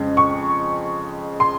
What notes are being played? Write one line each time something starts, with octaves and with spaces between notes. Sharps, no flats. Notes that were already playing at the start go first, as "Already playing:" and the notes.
Already playing: F2 C#3 G#3
C#6
C6